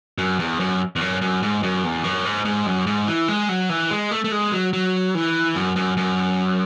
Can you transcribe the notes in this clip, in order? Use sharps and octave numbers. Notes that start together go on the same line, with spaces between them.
F#2
E2
F#2
E2
F#2
F#2
G#2
F#2
E2
F#2
G#2
G#2
F#2
G#2
E3
G#3
F#3
E3
G#3
A3
A3
G#3
F#3
F#3
E3
F#2
F#2
F#2